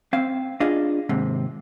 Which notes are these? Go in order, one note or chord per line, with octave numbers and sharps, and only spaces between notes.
C4 F5
D4 F4 G#4 D#5 F5
D#2 G#2 C3